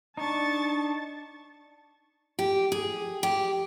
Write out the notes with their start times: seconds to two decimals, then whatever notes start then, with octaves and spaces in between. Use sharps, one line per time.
0.17 D4 D#4 A5 C#6 A6
2.39 G4
2.72 G#4
3.23 G4